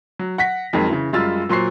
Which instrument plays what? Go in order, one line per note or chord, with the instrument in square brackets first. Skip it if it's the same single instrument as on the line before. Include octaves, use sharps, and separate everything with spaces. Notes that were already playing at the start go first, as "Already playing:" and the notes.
[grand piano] F#3
F#5 A#6 B6
F2 D#3 F#3 G#3 A#3
C#3 E3
F#2 G3 G#3 F4 E6 A6
A#2 F#3 C5 C#6 C7